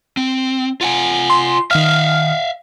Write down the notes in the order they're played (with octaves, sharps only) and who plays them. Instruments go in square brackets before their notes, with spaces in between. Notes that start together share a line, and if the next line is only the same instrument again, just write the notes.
[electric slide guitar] C4
F4 F#5 G#5
[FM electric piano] C6
[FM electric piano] D#3 F6 [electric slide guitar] E5 F5